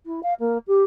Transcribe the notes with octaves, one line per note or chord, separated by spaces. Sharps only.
E4
F5
A#3
G4